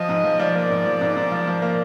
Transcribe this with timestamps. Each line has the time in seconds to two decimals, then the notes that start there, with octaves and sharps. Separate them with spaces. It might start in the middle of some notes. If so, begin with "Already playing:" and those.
Already playing: F3 D#5
0.09 G#2
0.24 F3
0.40 F3 D5
0.55 A#3
0.70 G#2
0.86 F3
1.01 G#2
1.16 G#2
1.32 F3
1.47 F3
1.62 A#3